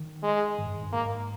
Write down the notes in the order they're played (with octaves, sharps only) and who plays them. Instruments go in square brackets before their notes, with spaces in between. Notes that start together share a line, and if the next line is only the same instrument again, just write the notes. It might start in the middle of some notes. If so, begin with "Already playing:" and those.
Already playing: [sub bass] D#3
[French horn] G#3
[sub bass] G#2
G2
G#2
G2
[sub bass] G#2 [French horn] A#3